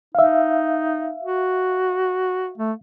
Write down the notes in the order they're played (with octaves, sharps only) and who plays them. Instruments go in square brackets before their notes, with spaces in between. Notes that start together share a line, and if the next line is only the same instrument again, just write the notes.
[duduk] D#4 [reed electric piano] E5 F5
[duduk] F#4
A3